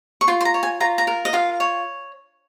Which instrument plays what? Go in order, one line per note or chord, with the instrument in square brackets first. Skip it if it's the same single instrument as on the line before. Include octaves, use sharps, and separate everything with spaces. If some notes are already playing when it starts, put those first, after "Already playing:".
[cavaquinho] C#6
F4 C6
C6
A#5
C#5
G#5
F4 A#5
A#5
A#4
D#5
F4 F5
C#5